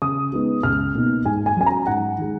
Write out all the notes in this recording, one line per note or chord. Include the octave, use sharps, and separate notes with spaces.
C#3 D#6
G#3 B3 D#4
C#2 F6
B2 A#3 D#4
G#2 G#5
G#5
F#3 C#4 G#5
A#5
G#2 F#5
D#3 G#3